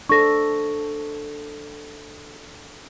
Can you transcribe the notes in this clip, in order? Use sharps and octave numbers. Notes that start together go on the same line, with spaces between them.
D4 A4 C5 C#6 A#6